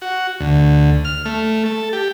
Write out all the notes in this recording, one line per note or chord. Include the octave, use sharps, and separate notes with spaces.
F#4
D2
F6
A3
A4
G4